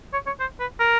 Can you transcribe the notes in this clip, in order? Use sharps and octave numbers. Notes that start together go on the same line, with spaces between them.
C#5
C#5
C5
B4
A#4